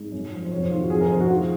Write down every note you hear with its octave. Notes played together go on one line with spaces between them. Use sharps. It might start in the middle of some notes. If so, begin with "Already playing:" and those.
Already playing: G#2
F#2
F3
C5
F2 C#5
C5
D#3 F4
F#4
F2 G#4
A#4
F2 C5
F#4
D#3 F4